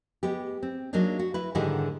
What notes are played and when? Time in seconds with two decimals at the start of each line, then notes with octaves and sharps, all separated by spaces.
0.23 G#3 B3 G4
0.63 C4
0.93 F#3 G#3 A#3 D4 D#4
1.19 F#4
1.34 E4 B4
1.55 G#2 D3 D#3 G3 E4 G#4